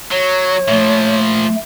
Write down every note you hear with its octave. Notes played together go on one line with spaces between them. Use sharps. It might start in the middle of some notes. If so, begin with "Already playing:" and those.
F#3 C#5
A#2 F3 A3